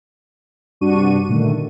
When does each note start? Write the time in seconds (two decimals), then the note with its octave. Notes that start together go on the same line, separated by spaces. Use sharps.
0.81 G2 C3 D4 F#4 C#6 D#7
1.29 A#2 D3 D#3 A3